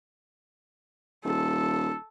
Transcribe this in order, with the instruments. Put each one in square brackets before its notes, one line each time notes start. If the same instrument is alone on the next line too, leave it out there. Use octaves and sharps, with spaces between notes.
[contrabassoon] D#1 [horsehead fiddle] A4